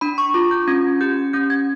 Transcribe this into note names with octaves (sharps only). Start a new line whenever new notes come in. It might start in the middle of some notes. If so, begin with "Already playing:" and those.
D4 B5
C#6
F4 D6
G6
C#4 G#6
G4 G6
C#4 G6
G#6